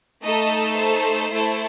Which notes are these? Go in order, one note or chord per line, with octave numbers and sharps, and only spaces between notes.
A3 D#4 A4 D#5
C5
A3 E4 A4